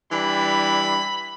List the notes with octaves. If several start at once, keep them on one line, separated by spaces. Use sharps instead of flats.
E3 G3 D4 B5